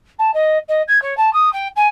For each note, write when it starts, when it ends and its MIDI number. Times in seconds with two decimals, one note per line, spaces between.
0.18 0.31 81
0.33 0.58 75
0.68 0.82 75
0.88 1.00 92
1.02 1.16 73
1.17 1.32 81
1.33 1.51 87
1.52 1.67 79
1.76 1.87 80